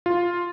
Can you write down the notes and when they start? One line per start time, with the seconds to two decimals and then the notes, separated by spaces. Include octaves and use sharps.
0.06 F4